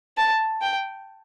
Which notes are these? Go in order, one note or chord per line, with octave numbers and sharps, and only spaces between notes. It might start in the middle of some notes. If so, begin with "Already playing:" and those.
A5
G5